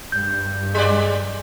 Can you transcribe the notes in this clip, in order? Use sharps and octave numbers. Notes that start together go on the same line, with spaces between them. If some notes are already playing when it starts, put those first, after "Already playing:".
G2 G6
G3 G#3 D5